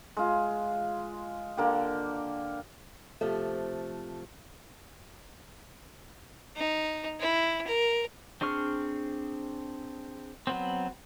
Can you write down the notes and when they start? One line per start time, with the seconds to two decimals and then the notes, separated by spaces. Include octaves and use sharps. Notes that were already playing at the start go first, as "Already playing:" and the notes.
0.17 G#3 F4
1.57 D3 A#3 G4
3.21 C3 F3 A3
6.56 D#4
7.19 E4
7.67 A#4
8.41 C4 D4 G#4 C#6 F6
10.47 F#3 B3 C4